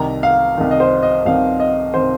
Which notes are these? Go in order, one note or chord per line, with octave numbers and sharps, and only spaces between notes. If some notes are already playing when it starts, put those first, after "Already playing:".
Already playing: C2 C3 D#3 A#5
F5
C2 C3 D#3
D#5
C5
D#5
C2 C3 D#3 F5
D#5
C3 D#3 C5